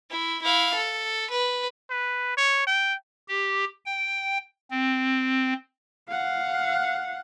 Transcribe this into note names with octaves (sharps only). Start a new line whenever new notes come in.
E4
E4 F5
A4
B4
B4
C#5
G5
G4
G5
C4
F5 F#5